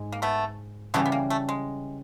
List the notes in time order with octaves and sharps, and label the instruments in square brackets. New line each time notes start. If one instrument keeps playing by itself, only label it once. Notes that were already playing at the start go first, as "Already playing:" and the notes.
Already playing: [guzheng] G#2 G#3
[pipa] A#3
A3 B3
[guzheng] C#3 E3 G3 [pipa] A3 B3
[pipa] B3
A#3
A3
G#3